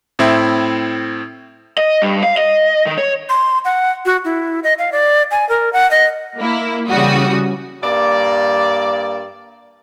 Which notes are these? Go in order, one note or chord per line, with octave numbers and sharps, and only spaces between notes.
A2 C4 E4
D#5
G2
F5
D#5
D#3
C#5
C6
F#5
F#4
E4
D#5
F5
D5
G#5
A#4
F#5
D#5
A#3 E4
C#3 E3 G3 F#4 D#6
G2 A#3 D5